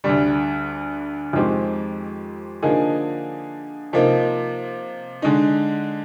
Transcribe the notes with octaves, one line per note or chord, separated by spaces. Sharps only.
D2 D3 G3
F2 D#3 G#3 C4 G4
D3 F3 A#3 D#4 G#4
C3 F3 A#3 D#4
D3 G#3 D#4